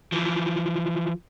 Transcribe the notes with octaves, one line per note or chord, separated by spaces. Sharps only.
E3 F3